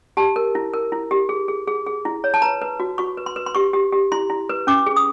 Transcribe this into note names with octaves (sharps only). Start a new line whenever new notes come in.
G4 A5
A#4
E4
A#4
E4
G4
G#4
G#4
G#4
G#4
E4
C#5
A5
B4 A#5
B4
F#4
F#4 C#6
B4
C6
B4
C6
G4 C#6
G4
G4
E4 C6
E4
B4
C#4 D6
G#4
D#6